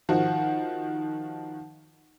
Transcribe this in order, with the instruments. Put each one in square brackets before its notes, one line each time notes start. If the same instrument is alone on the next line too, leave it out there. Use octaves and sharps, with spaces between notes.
[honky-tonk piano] D#3 F3 F#4